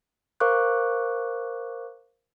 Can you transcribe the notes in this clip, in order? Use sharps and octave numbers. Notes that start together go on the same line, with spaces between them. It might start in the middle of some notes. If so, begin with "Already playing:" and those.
A#4 C5 F5 C#6 D6 F#6